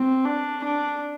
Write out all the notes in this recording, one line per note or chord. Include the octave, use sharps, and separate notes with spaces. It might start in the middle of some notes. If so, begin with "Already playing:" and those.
Already playing: C4
D4
D4